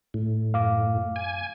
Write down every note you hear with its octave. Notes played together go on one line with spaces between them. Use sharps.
A2
F#2 F5 D6
G#5